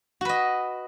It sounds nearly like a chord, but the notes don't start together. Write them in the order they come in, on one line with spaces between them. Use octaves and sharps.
F#4 B4 D#5